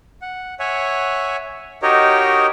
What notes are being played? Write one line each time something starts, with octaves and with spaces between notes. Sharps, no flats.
F#5
C#5 E5 F#5 G#5
D#4 F#4 G4 A#4 C#5 D#5